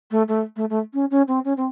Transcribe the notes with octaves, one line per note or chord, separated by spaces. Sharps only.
A3
A3
A3
A3
C#4
C#4
C4
C#4
C4